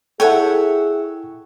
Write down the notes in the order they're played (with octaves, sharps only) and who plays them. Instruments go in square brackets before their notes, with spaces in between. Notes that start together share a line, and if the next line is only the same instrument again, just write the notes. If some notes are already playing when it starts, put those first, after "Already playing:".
[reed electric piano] E4 G5 [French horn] G#4 [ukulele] A4 A5 [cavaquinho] C#5 E5 F#5